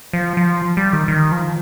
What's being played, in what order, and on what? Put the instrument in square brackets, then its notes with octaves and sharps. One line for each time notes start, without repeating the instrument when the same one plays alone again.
[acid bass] F3
F3
G3
D#3
D#3
F3